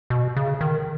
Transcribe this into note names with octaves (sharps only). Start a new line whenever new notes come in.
B2
C#3
D#3